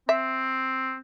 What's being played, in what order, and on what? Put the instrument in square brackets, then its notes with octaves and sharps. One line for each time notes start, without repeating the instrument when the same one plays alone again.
[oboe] C4 [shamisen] E5